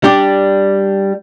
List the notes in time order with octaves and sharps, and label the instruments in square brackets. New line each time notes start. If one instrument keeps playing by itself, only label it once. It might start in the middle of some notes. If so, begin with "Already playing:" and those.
[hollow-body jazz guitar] G3 D4 G4